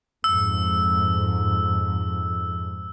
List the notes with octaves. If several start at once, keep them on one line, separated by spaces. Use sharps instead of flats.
F2 G#2 E6